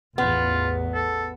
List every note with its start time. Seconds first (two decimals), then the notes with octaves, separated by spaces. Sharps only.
0.18 A1 E2 B3 F4
0.94 A4